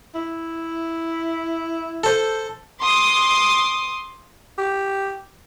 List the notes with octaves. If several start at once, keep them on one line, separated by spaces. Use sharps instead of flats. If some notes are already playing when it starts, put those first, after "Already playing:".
E4
A4 C5
C6 D6 D#6
G4